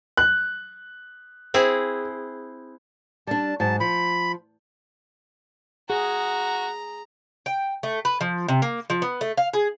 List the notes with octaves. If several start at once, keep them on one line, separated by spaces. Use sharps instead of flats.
F#6
C4 E4 G#4
G3 D4 A5
G#2 F#3 A5
F3 B5
F#4 G#4 A#5
G5
A3
B4
F3
C3
A#3
F3
B3
A3
F5
G#4